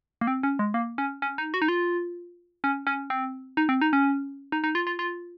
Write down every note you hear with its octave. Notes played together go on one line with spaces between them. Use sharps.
A#3
C4
C#4
G#3
A#3
C#4
C#4
D#4
F#4
D#4
F4
C#4
C#4
C4
D#4
C4
D#4
C#4
D#4
D#4
F4
F4
F4